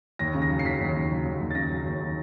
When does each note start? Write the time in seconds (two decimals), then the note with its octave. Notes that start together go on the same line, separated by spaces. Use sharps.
0.19 D#2 A#6
0.34 C#3
0.42 A#6
0.50 F#3
0.59 C7
0.65 D#2 B6
0.79 D#2
0.95 C#3
1.11 F#3
1.25 D#2
1.41 D#2
1.51 A6
1.55 C#3 A#6
1.70 F#3
1.86 D#2